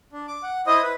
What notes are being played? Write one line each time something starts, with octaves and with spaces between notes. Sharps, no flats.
D4
D6
F#5
E4 C5 D#5 D#6
B4